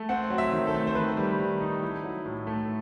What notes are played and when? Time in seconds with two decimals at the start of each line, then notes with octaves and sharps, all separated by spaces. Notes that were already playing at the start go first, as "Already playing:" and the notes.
Already playing: A3
0.09 C4 F#5
0.30 F#3
0.38 E5
0.52 D#3
0.67 A4
0.74 A3
0.87 C5
0.95 D#3 B4
1.17 G3
1.39 D#3
1.61 D#4
1.83 E4
2.04 F#3
2.26 A2
2.47 A3